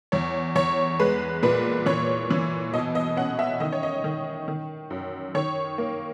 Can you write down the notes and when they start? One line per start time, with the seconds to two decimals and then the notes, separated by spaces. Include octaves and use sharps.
0.12 E2 C#5
0.55 E2 C#5
0.99 G#3 B4
1.43 A#2 B4
1.86 E3 C#5
2.30 E3
2.74 B2 D#5
2.95 D#5
3.17 C#4 F#5
3.39 E5
3.60 D#3 D#5
3.72 C#5
3.83 D#5
4.04 D#3
4.48 D#3
4.90 F#2
5.35 D#3 C#5
5.78 A#3